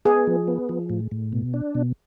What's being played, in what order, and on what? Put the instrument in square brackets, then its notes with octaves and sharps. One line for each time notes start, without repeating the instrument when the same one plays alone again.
[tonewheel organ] B3 [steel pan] G#4
[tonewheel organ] F3
B3
F3
A2
A2
B2
D4
B2